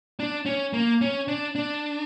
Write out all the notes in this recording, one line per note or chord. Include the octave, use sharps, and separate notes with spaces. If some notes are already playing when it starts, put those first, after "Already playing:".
D4
C#4
A#3
C#4
D4
D4